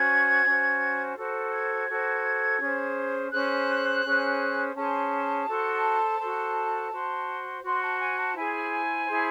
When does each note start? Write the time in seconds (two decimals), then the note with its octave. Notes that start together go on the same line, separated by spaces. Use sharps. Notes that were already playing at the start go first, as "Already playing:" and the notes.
Already playing: C#4 F#4 C5 G#6
0.44 C#4 F#4 C5
1.15 F#4 A4 C5
1.51 G#6
1.88 F#4 A4 C5
2.59 C#4 G#4 C5
3.31 C#4 G#4 C5 F#6
4.04 C#4 G#4 C5
4.75 C#4 G#4 C5 A5
5.47 F#4 A4 C5
6.19 F#4 A4 C5
6.91 F#4 C5
7.62 F#4 C5 C6
7.81 A5
7.98 G#5
8.16 A5
8.34 E4 G#4 C5 G#5
9.06 E4 G#4 C5